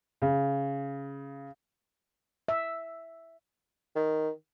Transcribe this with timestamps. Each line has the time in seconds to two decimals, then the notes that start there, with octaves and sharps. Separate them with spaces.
0.22 C#3
2.48 E5
3.96 D#3